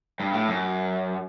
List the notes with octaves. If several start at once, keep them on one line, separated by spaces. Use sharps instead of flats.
G2
A2
F#2